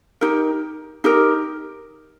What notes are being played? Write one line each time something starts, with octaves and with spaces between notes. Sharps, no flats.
D#4 G4 A#4
D#4 G4 A#4